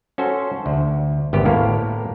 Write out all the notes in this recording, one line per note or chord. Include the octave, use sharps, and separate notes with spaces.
C#4 F#4 A4 C5
D2
G#1 D2 B3 G4
A2 A#3 B3 A#4